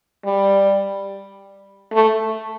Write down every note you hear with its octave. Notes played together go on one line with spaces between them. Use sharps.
G3
A3